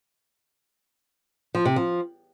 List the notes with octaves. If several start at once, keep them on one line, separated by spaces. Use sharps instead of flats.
F3
C3
F3